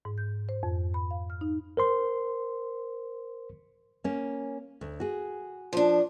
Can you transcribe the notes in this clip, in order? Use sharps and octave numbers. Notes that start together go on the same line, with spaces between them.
G#2
G6
C5
F2
B5
F5
F6
D#4
A#4 C5 C6
A#3 C#4
D2
F#4 G#4
F3 D4